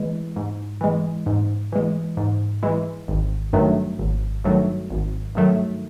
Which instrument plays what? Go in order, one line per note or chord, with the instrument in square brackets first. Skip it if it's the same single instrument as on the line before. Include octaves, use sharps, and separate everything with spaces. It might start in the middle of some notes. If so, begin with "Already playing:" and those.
Already playing: [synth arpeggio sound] E3 G#3
G#2
E3 G#3
G#2
E3 G#3
G#2
E3 G#3
G#1
G2 D#3 F#3 A3
G#1
G2 D#3 F#3 A3
G#1
G2 D#3 F#3 A3